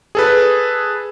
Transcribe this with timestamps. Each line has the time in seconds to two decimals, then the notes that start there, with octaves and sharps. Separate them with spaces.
0.15 G#4 A4 B4